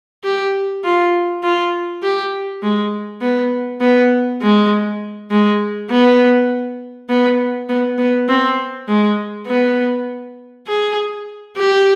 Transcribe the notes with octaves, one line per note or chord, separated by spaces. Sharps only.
G4
F4
F4
G4
G#3
B3
B3
G#3
G#3
B3
B3
B3
B3
C4
G#3
B3
G#4
G4